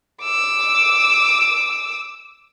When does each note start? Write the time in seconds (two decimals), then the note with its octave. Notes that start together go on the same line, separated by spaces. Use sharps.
0.24 D6 E6